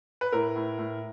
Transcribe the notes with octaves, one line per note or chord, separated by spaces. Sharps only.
B4
A2 A#4
A2
A2